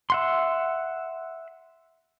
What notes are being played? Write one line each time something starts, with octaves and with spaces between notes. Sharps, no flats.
E5 F#5 C6